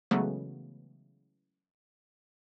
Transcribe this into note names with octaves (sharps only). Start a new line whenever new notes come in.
C#3 E3 F#3 G#3 A3 B3